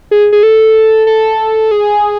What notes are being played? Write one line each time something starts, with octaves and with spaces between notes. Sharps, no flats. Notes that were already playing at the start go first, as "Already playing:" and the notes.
G#4
G#4
A4
A4
G#4